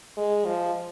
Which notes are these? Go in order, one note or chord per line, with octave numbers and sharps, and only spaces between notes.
G#3
F3